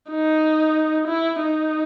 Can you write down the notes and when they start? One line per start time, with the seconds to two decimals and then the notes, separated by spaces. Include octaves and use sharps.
0.10 D#4
1.08 E4
1.41 D#4